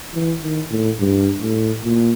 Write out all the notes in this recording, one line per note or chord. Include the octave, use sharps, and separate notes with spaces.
E3
D#3
A2
G2
A2
A#2